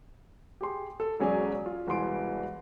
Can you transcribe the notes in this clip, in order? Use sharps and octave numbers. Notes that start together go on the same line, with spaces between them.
G4 G#4 C6
A4
E1 F#3 C#4 G#4 D5 G#5
F4
E1 C2 E3 C6 D7